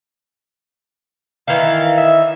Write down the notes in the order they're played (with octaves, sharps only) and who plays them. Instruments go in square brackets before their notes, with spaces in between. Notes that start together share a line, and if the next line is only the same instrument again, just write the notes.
[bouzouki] D#3 E3 [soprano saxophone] F5
[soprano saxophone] E5